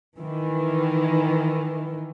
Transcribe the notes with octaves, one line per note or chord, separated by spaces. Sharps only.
D#3 E3